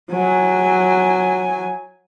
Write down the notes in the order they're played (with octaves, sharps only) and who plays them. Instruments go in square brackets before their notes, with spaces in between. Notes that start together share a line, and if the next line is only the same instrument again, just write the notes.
[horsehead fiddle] F#3 G#5